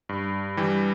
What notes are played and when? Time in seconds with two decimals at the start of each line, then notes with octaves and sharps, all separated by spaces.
0.09 G2
0.57 E3 G3